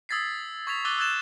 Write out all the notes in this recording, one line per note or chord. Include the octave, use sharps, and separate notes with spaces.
D#6 E6 G#6 A6 B6 C7
C#6 G#6 A6 B6 F7
D6 E6 F#6 A6 D#7 G7
E6 F#6 G#6 A6 E7